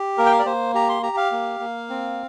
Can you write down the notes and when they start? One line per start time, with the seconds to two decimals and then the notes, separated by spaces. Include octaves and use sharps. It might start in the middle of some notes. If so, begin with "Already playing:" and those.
Already playing: G4
0.18 A#3 A#4
0.26 G5
0.32 F5
0.39 D5
0.46 A#3 C5
0.74 G4 A#5
0.89 C6
1.03 G4 A#5
1.17 F5
1.32 A#3
1.60 A#3
1.90 C4